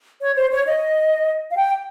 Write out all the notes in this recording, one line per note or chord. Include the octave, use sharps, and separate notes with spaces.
C#5
C5
C#5
D#5
F5
G5